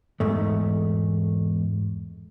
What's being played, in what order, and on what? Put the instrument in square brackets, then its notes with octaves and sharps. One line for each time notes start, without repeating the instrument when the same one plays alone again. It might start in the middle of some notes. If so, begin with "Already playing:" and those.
[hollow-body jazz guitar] E2 G#2 A3